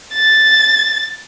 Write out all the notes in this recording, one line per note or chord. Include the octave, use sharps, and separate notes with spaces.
A6